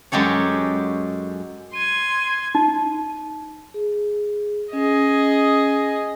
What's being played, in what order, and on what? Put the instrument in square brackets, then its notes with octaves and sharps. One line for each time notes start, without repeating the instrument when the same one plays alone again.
[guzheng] F#2 G#3 G4 A4 C#5
[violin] C6 G#6 [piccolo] D#7
[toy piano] D#4
[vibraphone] G#4
[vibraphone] C#4 [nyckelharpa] G#4 D#5